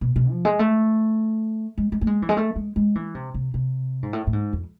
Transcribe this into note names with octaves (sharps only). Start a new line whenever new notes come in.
B2
B2
F3
G#3
A3
G#3
G#3
A3
G#3
E3
G#3
A3
G#3
G#3
E3
C3
C3
C3
G#2
A2
A2
G#2
F2